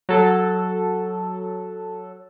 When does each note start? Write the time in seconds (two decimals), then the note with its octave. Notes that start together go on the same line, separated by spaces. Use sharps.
0.09 F#3 A4